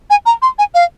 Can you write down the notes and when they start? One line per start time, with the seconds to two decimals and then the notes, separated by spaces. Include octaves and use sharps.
0.10 G#5
0.26 A#5
0.42 C6
0.58 G#5
0.74 F5